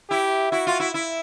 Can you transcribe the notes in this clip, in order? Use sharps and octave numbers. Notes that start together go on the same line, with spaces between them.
E4 G4
E4 F#4
F4
E4
E4